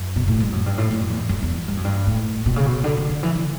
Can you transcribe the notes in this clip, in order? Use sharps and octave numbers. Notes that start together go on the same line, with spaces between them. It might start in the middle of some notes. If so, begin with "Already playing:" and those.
Already playing: F#2
B2
A2
G2
F#2
G2
A2
A2
F#2
E2
F#2
E2
G2
F#2
G2
A2
B2
C#3
B2
D3
D3
D3
E3
D3